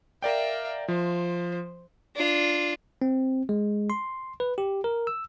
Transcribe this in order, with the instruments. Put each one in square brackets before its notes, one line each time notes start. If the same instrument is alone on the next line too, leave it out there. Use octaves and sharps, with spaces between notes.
[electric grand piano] A#4 D5 G5 [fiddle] E5 F5
[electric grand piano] F3 [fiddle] C5
[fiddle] D4 F4
[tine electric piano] C4
G#3
C6
B4
G4
A#4
E6